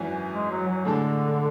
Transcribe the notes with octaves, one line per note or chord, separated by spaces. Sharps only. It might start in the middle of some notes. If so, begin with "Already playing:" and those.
Already playing: G#1 F#2 E3
G#3
F#3
F#3
A2 D3 G#3 D4 A4